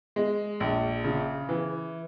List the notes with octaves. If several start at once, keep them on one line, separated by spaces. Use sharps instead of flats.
G#3
A#1
C#3
E3